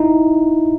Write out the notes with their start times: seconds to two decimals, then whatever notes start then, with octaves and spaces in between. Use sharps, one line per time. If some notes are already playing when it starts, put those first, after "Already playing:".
Already playing: D#4 E4